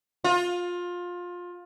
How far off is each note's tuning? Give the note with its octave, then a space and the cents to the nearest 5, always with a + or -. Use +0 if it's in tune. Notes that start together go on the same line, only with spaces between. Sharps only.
F4 +20